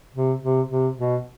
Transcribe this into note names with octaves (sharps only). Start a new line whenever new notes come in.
C3
C3
C3
B2